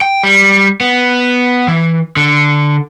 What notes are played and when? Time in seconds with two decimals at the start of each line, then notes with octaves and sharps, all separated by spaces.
0.01 G5
0.24 G3
0.81 B3
1.68 E3
2.17 D3